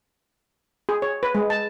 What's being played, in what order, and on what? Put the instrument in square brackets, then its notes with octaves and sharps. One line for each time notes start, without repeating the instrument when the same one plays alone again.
[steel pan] G#4
C#5
B4
G#3
A5